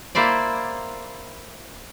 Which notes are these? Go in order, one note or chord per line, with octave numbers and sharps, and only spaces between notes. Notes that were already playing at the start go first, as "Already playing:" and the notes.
A#3 E4 C5 D5